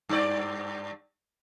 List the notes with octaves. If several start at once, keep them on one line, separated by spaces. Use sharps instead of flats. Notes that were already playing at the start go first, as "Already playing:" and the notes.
G2 D5